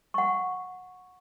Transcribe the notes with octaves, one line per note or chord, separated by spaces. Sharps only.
F#5 C#6